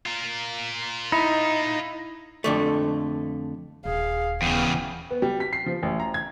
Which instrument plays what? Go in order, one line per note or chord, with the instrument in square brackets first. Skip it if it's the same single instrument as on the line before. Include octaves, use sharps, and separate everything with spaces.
[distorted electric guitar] F4 A#4
[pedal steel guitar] D#4 [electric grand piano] E4 B5
[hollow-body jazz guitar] F2 D3 A3
[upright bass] D#1 [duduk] G#4 [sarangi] F5
[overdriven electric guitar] E2 C#3 [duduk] B3 [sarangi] G5
[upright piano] B3
G3
B6
C7
F3
A1
A#5
G#6